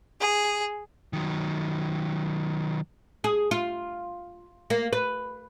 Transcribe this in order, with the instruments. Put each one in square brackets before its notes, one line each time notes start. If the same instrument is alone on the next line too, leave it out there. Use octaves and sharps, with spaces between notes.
[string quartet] G#4
[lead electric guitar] D#3 F#3
[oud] G#4
F4
A#3
B4